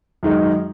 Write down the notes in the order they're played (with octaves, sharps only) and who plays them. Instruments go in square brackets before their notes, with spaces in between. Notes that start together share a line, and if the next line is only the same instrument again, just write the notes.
[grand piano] F#2 D#3 G#3 D#4